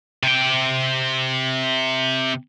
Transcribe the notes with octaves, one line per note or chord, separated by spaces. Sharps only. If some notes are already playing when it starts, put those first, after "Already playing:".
C3 G5